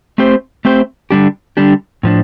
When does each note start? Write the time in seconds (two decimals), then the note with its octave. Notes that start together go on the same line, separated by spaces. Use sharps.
0.18 A3 C4 G4 C5
0.65 A3 C4 G4 C5
1.10 D3 G3 D4 G4
1.57 D3 G3 D4 G4
2.03 A2 F3 D4